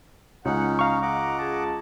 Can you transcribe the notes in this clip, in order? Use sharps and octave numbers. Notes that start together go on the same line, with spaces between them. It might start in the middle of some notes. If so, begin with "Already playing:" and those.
C#2 C#4 D#4 F#5
F5 A#5 C#6
D#5 F#5 D6
G#4 A5